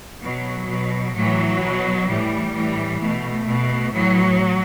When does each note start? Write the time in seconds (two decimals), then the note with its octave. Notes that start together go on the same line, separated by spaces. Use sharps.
0.23 B2 F#3
0.69 B2
1.16 A2 E3 F#3
1.62 B2
2.08 A2 E3 G3
2.54 A2 E3
3.01 B2 A3
3.46 B2
3.93 A2 E3 F#3